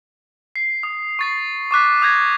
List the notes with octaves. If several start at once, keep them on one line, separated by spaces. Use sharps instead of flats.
C7
D#6
C#6 A6 C7
C#6 D6 F#6 B6
D#6 G6 G#6 A#6